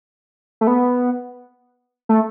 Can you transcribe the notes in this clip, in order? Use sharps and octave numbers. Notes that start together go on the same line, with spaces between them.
A3
B3
A3